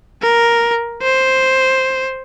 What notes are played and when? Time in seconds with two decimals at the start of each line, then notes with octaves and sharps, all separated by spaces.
0.22 A#4
1.02 C5